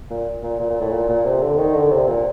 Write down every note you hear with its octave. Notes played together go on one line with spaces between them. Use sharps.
A#2
A#2
A#2
A#2
A2
A#2
A#2
C3
D3
D#3
D3
C3
A#2